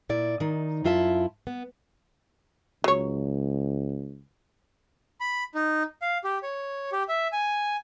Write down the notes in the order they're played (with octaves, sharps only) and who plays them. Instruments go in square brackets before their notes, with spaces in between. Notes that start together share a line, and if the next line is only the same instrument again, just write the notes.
[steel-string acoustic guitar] A#2 E4 D5
D#3 D#4
F#2 E4 F4 E5 G#5 A5
B3
[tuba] C#2 [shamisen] F#3 C#5
[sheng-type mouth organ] B5
D#4
F5
G4
C#5
G4
E5
G#5